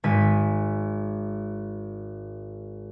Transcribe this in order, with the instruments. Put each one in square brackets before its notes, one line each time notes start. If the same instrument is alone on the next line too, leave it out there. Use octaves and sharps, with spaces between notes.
[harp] G#1 G#5 B6